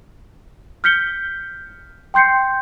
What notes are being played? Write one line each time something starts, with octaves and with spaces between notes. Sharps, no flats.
F6 G6 B6 C#7 G7
G5 C6 G6 C7 C#7